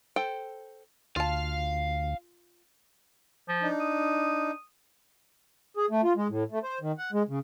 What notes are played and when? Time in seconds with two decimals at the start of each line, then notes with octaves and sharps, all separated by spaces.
0.16 A4 C5 G5
1.16 D2 F4 F5 A5
3.49 F3
3.62 D4 D#4
3.80 D#6
5.77 G#4
5.90 A3
6.03 F4
6.16 G#3
6.29 A2
6.51 A3
6.63 C5
6.81 D#3
6.98 F#5
7.12 G#3
7.28 C#3